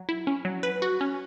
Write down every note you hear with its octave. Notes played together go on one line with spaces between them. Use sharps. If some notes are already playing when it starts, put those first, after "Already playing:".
Already playing: F#3
E4
C#4
F#3
B4
F#4
C#4